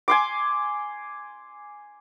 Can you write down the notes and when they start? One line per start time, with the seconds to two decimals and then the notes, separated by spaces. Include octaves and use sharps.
0.08 G#5 C6 D6